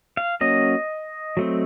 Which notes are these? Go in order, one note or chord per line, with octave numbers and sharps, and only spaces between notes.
F5
F#3 A#3 C#4 D#5
F#3 A3 C4